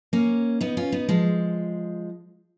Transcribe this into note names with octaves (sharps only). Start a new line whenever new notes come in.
A#3 C#4
B3 D#4
C#4 F4
B3 D#4
F3 G#3